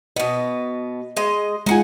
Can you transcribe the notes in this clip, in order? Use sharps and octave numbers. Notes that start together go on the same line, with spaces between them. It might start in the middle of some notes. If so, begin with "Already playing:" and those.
B2 B3 D#5
G#3 D#5
G#3 D#4 F4 F#5 G#5